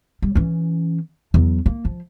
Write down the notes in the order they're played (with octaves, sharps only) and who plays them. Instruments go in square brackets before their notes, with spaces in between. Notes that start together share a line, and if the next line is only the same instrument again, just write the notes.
[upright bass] G3
E3 C#4
E2 F#3
A#3
F3